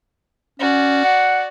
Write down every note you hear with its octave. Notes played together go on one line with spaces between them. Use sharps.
C#4 F#4 D5
F#5